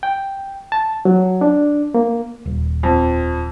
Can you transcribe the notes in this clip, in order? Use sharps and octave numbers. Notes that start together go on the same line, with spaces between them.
G5
A5
F#3
D4
A#3
D#1
F2